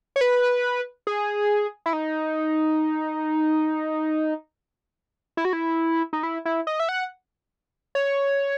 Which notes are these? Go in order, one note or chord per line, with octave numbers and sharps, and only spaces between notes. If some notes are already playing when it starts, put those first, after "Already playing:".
C#5
B4
G#4
E4
D#4
E4
F#4
E4
D#4
E4
E4
D#5
E5
F#5
C#5